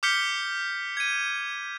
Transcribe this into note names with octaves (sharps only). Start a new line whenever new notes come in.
D6 F6 G6 B6 C#7 G7
G#6 D#7